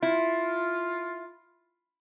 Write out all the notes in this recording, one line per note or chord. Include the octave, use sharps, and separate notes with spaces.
E4 F4